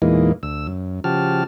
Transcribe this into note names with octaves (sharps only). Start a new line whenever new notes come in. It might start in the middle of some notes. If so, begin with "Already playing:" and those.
E2 A#2 E3 G#3 A#3 D#4
D2 E6
F#2
C#3 F3 F#4 G4 A5 F6